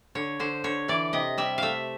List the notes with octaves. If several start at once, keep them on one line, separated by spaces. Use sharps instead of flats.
D3 C#5
D3 C5
D3 C#5
E3 D5
C3 D#5
G3 E5
A3 E5 F5